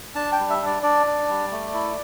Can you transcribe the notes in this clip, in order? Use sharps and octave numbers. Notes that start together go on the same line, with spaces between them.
D4 A5
G5
G3
E5
D4 D5
D4 D5
D4
G3
A3
E4